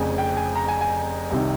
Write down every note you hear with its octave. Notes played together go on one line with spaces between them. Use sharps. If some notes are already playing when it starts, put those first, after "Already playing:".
Already playing: F1 F2 C#3 G#5
G5
G#5
A#5
G#5
G#5
C2 C3 D#3